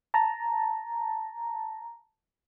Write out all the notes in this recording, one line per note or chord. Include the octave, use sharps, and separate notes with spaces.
A5 A#5